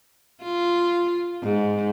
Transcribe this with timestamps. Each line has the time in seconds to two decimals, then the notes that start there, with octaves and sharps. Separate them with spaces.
0.43 F4
1.43 G#2